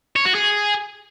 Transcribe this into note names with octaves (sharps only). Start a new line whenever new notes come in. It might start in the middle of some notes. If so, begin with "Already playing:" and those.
C#5
F#4
G#4